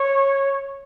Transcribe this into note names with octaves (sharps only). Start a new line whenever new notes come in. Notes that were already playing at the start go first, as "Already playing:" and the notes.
Already playing: C#5